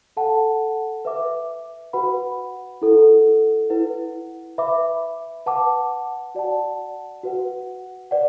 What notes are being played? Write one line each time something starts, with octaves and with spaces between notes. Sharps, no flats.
A4 F#5 A5
B4 E5 D6
F#4 B4 F#5 B5
E4 A4 F#5
E4 B4 F#5
B4 E5 B5 D6
B4 F#5 A5 D6
F#4 D5 F#5 A5
F#4 B4 F#5
B4 D5 F#5